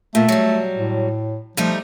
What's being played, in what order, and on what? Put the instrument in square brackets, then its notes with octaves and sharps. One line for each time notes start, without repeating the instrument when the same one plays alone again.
[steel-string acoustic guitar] A#2 [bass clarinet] A3
[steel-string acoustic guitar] F#3 G3
[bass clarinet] A2
[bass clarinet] F3 [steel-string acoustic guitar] G3 A3 D#4